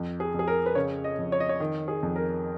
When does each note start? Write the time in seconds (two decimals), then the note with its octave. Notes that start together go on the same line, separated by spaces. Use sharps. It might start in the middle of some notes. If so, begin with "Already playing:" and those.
Already playing: F2
0.20 G#4
0.34 F2
0.39 G#4
0.48 A#4
0.66 B4
0.75 C#3 C#5
1.04 D#5
1.19 F2
1.32 C#5
1.40 D#5
1.49 C#5
1.60 D#3
1.88 G#4
2.03 F2
2.16 A#4